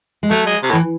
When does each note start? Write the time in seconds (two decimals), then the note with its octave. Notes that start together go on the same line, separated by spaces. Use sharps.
0.23 G#3
0.30 F#3 A3
0.46 G#3
0.63 C3
0.70 A2
0.73 E3